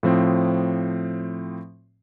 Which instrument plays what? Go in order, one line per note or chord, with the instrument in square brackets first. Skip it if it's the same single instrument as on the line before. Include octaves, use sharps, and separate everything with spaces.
[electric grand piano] A2 F3 C4